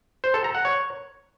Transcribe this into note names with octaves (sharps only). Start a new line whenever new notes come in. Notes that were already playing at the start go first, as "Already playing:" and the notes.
C5
A4
A#5
F#5
C#5